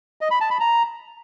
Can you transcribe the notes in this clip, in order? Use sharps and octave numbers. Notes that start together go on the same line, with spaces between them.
D#5
B5
A5
B5
A#5